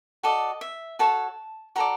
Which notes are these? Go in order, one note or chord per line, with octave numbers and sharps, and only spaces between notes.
F#4 A4 D5 D#5
E5
F#4 A4 C#5 A5
F#4 A4 D5 A#5